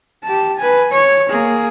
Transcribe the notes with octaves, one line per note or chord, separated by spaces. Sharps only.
G4 A5
B4 G#5
C#5
A#3 G#4